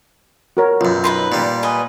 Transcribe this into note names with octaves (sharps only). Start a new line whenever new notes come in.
F#4 A#4 C#5
B1 F#2 F4
D#4 B4 C6
A#2 G3
B4 D#5 G#5